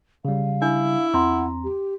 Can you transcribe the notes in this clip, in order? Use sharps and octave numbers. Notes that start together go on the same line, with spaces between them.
C#3 G3 F5
D4 E4
E2 C4 F#5 A#5 C6
G4